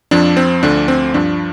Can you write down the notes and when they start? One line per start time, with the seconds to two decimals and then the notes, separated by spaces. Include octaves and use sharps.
0.11 F2 F3 D4
0.37 C4
0.63 D2 D3 F3 D4
0.88 C4
1.14 G2 F3 D4